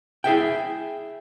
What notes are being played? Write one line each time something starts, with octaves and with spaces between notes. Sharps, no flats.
E4 G#4 E5 G5